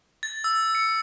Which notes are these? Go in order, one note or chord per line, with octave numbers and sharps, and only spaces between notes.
A6
E6
C#7